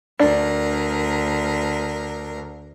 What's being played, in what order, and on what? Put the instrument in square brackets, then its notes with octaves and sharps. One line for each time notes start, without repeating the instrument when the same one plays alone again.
[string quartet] D2 A#4 [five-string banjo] D4